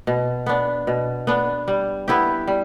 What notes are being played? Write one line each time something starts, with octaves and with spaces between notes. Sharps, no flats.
B2
B3 D4
B2
B3 D4
G3
B3 E4 G4
G3